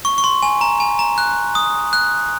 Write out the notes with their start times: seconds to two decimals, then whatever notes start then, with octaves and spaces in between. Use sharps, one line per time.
0.05 C#6
0.18 C#6
0.24 C6
0.42 G#5
0.61 A#5
0.80 G#5
0.99 A#5
1.18 F#6
1.55 D#6
1.93 F#6